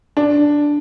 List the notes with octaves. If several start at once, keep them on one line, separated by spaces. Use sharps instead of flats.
D4